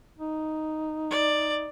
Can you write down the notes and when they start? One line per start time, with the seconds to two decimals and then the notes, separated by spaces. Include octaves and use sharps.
0.19 D#4
1.10 D5